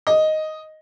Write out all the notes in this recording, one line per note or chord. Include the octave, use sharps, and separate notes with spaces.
D#5